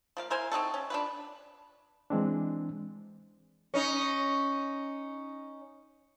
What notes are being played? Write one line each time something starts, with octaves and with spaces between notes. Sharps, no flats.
F3 A#3 F5
E4 A#4 C5 G#5
C4 D#4 F#4 A4
C#4
D4 F4 B4
E3 G#3 C4 D4
C#4 D#4